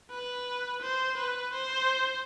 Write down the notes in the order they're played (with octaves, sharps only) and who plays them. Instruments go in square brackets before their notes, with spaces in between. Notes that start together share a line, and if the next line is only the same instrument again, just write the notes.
[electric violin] B4
C5
B4
C5